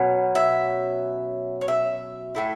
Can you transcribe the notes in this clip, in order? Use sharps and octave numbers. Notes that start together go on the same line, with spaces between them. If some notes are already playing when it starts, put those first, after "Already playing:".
Already playing: B2 F#3 C#4
E5
C#5
E5
A2 A3 E4